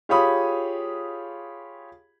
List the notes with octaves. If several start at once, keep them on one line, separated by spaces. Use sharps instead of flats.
F4 G4 G#4 C#5 B5 D#6